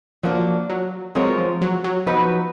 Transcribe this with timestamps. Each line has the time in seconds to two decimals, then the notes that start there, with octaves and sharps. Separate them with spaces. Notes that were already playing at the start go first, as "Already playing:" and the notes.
0.23 F3 F#3 A#3 D4
0.70 F#3
1.15 F#3 G#3 C4 F4 A#4 C#5
1.38 F3
1.62 F#3
1.84 F#3
2.06 F3 F#3 B3 D#4 F#4 B4